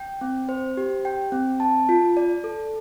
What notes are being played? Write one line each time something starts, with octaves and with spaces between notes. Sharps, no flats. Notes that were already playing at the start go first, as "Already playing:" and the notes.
Already playing: G5
C4
C5
G4
G5
C4
A5
F4
D5
A4